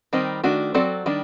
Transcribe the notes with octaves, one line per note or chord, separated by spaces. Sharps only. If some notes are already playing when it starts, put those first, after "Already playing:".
D#3 G3 C4 D#4
D#3 A3 D4 F#4
F#3 C4 F#4 A4 D5
D#3 G3 D4